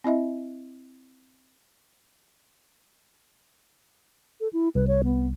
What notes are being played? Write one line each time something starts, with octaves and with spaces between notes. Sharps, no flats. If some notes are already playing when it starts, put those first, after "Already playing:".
C4 E4 D#5 E5
A4
E4
C2 B4
C#5
B3